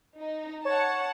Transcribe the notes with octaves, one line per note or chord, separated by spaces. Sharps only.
D#4
C#5 F#5 A5